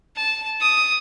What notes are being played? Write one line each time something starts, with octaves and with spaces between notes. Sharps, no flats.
A5
D#6